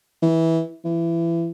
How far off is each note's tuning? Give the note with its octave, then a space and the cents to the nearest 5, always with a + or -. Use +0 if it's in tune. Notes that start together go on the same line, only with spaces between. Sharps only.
E3 -15
E3 +25